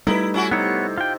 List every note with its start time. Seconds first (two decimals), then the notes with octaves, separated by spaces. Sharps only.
0.07 G3 A3 D#4 E4 B4
0.34 C#4 E4 F#4
0.51 C3 B3 D#4 E4 C#5
0.98 F4 G5